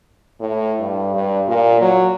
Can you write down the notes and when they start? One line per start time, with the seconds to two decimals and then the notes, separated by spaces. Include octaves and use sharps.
0.40 A2
0.80 G2
1.15 G2
1.48 A#2
1.82 F#3